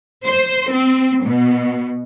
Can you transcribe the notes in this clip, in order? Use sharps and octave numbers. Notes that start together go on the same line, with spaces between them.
C5
C4
B2